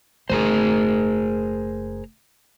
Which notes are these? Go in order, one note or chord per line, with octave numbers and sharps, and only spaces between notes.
F#1 A3 G#4 A#4 C5